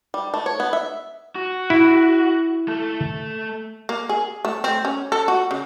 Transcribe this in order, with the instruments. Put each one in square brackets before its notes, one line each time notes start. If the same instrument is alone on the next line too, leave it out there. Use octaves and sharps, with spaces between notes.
[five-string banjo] G3
A3
C#5
B3
E5
[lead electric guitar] F#4
[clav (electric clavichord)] E4
[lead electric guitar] A3 A4
[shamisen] A#3
G#4
A3
C4
C#4
A4
F#4
C#3